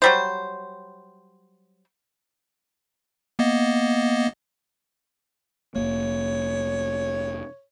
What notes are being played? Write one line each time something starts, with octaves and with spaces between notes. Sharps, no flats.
F#3 G3 C5
A#3 B3 D#5
F1 E2 A#3 C#5